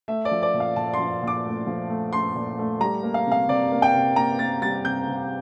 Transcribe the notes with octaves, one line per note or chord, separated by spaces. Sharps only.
A3 E5
D5
F3
D5
A#2
F5
A#2 A5
C6
F3
A#2 D6
A3
F3
A3
A3 C6
A#2
A3
G3 A#5
A#3
F5
C3 F5
C3 D5
A#3
G5
C3
A#3 A#5
A#3 A6
G3 A6
C3 G6
C3